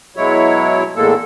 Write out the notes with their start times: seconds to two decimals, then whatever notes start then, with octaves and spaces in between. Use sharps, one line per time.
0.16 B2 F#3 G#3 E4 C#5
0.96 E2 A2 G#3 A#3 A4